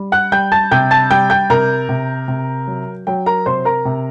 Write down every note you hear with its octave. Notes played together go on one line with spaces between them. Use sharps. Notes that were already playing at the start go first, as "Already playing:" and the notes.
Already playing: G3
F#5 F#6
G3 G5 G6
A5 A6
C3 G5 G6
A5 A6
G3 G5 G6
G5 G6
C3 A#4 A#5
C3
C3
F#3
F#3 G5
A#4 A#5
C3 C5 C6
A#4 A#5
C3